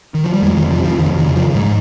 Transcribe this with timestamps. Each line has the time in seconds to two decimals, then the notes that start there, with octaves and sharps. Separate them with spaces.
0.14 D#3
0.24 F3
0.33 G3
0.42 F2 G#3
0.57 D#3
0.70 C3 F3
0.85 F3
0.98 F2 D#3
1.18 D#3
1.26 C#3
1.36 F3
1.55 G#2 G#3